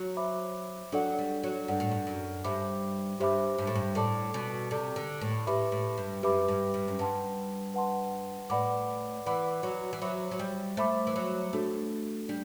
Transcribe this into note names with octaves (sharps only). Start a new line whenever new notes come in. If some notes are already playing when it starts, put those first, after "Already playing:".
Already playing: F#3
C5 E5 B5 D6
F#3 D4 A4 D5 F#5
G3
F#3
G2 D4 A4 D5 F#5
A2
G2
F#2
G2 G4 C5 E5 B5 D6
G2 G4 C5 E5 B5 D6
G2
A2
G2
A2 A4 D5 A5 D6
B2
C3 A4 D5 A5 D6
D3
A2
A2 G4 B4 E5 B5 D6
A2
G2
F#2 G4 B4 E5 B5 D6
G2
G2
F#2
G2 B4 F#5 A5 C6
B4 F#5 A5 C6
A2 B4 D5 F#5 B5 D6
E3 B4 D5 F#5 B5 D6
F#3
E3
F#3 C5 E5 B5 D6
F#3
G3
A3 C5 E5 B5 D6
E3
F#3
A3 D4 F#4 A4
G3 D4